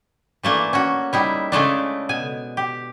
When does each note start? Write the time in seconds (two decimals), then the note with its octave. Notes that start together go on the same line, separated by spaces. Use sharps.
0.43 E3 A3 A#3 D4
0.73 C#4 F#4
1.13 G3 D#4 E4
1.52 C#3 G#3 A3 D4
2.09 B2 G#5
2.57 G4